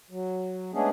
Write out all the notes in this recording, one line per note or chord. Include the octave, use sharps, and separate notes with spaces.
F#3
G#3 A3 B3 C#4 D4 G#4